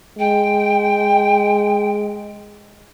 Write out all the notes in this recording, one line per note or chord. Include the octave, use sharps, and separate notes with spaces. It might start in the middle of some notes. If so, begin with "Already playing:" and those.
G#3 G5